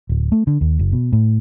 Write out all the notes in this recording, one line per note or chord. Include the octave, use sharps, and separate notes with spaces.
D1
A3
D3
D#2
F#1
B2
A2